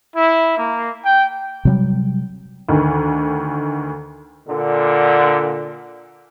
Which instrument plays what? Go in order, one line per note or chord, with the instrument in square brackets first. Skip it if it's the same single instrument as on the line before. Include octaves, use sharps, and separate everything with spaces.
[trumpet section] E4
A#3
G5
[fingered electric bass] C3 F#3 G3
[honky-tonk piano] D2 D#3
[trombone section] A#2 D3